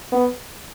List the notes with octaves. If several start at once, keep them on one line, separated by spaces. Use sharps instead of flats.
B3